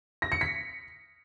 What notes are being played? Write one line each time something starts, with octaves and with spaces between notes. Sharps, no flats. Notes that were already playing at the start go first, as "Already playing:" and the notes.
A#6
C#7
B6